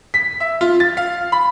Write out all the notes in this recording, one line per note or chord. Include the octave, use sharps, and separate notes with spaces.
B6
E5
F4
A6
F5
B5